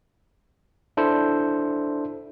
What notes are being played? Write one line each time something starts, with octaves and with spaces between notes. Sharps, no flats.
D4 E4 A4 C5